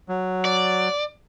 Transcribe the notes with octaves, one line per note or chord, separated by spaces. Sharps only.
F#3
D5